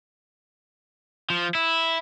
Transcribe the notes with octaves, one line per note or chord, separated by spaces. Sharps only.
F3
E4